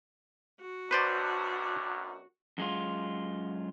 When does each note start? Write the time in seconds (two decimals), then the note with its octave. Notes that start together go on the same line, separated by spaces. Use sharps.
0.61 F#4
0.91 B1 F#2 D4 B4 C5 D5
2.58 F#2 G#3 F4